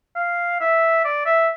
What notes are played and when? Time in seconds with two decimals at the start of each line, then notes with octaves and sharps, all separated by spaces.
0.16 F5
0.60 E5
1.05 D5
1.26 E5